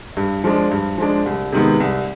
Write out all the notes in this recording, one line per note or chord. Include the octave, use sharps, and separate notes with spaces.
G2
F3 G#3 D4
G2
F3 G#3 D4
C2
C3 D#3 G#3 B3
C2